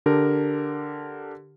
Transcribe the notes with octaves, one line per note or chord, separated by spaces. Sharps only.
D3 D4 G4 A#4